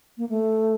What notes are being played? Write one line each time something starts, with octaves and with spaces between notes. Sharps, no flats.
A#3
A3